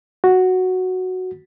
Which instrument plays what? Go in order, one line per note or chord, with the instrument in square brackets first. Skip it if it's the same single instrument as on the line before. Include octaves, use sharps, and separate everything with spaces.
[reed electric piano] F#4